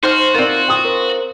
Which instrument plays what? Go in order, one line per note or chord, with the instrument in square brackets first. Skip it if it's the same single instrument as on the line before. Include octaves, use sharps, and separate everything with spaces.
[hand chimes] D#4 [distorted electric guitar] F#4 [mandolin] C5 C6 F6
[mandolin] C4 F4 [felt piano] A#4 D5
[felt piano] G5 D#6
[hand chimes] A#4 C5